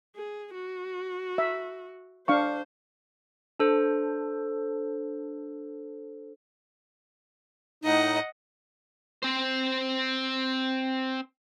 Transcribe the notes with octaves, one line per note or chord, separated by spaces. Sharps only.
G#4
F#4
E5
D4 C5 F5 C#6
D4 A4 C5
A2 D#4 D#5 F#5
C4 C5